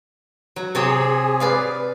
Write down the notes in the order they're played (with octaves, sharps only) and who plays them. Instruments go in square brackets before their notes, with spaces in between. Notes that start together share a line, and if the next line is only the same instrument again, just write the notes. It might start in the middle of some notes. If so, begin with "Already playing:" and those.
[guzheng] F#3
[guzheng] C3 C#5 G5 [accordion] G#4
[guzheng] B4 D5 F5